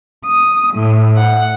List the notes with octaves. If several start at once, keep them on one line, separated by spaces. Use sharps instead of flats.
D#6
A2
F#5